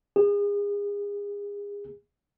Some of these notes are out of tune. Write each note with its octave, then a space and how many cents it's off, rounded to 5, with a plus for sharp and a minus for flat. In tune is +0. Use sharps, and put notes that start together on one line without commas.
G#4 -35